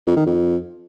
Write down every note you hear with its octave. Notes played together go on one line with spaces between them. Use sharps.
F2
D#3
F2